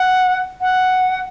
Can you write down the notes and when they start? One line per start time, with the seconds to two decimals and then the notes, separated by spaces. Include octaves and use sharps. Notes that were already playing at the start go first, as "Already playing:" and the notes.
Already playing: F#5
0.61 F#5